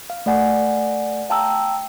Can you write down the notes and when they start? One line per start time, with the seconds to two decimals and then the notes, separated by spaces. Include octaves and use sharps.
0.10 F5
0.26 A3 D5 F#5 G#5
1.30 F5 G5 A5 A#5 E6